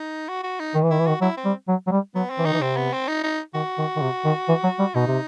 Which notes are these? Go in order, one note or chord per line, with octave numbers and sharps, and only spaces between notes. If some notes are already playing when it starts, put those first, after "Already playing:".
Already playing: D#4
F#4
F#4
D#4
D#3
E3
D#3 E4
E3
D#3 F#4
F#3 E4
C4
G3
F#3
F#3
G3
F#3 B3
C4
E3
D#3 D#4
E3
C3 C4
B3
C4
D#4
D#4
D#3 F#4
D#3
D#3
C3
D#3
E3
F#3
G3
B2 D#4
C3